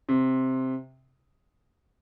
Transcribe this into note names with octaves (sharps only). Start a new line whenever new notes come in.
C3